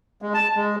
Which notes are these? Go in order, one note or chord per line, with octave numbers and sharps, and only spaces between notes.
G#3
A5
G#3